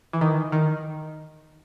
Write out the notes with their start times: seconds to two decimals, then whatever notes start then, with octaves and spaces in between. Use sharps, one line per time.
0.13 E3
0.21 D#3
0.52 D#3